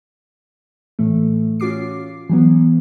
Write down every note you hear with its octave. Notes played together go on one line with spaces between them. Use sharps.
A2 E3 A3
C#4 F4 F#4 D6 C7
E3 F#3 B3